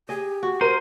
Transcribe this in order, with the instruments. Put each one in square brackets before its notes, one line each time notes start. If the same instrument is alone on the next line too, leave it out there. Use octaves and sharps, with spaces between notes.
[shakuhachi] G4 [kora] G#4 D#5
[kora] F#4
[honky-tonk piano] A#4 D#7 [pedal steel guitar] C5